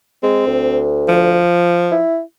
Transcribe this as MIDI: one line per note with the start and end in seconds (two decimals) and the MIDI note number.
0.23 0.46 56
0.23 0.87 60
0.47 1.40 38
1.08 2.00 53
1.91 2.21 64